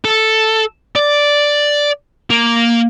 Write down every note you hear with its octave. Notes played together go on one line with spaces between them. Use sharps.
A4
D5
A#3